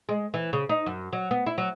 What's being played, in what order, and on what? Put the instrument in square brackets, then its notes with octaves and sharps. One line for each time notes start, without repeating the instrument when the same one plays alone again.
[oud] G#3
E3
C#3
D#4
F#2
F#3
B3
E4
F#3